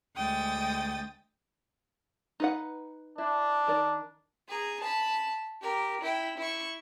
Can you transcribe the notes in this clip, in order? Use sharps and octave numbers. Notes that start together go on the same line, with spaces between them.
D2 G#3 G5 D#6 A6
D#4 B4 F#5
D4 E4
D#3 A#4 D5
G#4 A#5
A5 B5
G4 A#4
E4 G5
E4 C#6